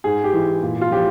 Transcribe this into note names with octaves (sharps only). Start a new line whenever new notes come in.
G#2 G#4
G4
E3
A#2
F4
F3 G4